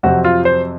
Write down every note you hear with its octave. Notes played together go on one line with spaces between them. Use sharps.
F2 C3 F#3 C4 F#4
F4
C5